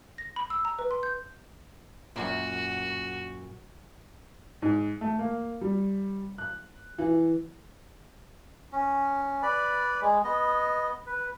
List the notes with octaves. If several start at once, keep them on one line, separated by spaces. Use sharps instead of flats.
A#6
B5
E6
A#5
B4
C6
G6
F#2 A#2 F#4
G#2
A3
A#3
G3
F#6
E3
C#4
B4 D5 B5
G#3
B3 D#5
B4